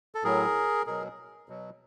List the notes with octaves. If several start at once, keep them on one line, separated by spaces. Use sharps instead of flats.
A4
A2 F#3 G#4 A#4
B2 F#3 G#4 A#4
B2 F#3